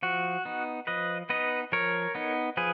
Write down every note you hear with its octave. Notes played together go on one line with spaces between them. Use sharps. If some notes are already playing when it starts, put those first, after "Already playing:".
F3 F#4
B3 D#4
F3 B4 D#5
B3 D#4 B4 D#5
F3 A#4 C#5
B3 D#4
F3 G#4 B4